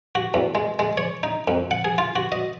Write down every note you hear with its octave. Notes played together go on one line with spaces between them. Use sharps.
F#4
E2
G#3
G#3
C#5
D#4
F2
F#5
G#4
F4
F#4
D#5